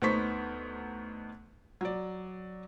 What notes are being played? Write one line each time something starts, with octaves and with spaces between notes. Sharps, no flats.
D2 B3 D#4 C5 C#6 B6
F#3 D5